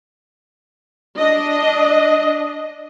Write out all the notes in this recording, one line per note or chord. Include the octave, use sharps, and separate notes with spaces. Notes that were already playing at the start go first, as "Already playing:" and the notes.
D4 D#5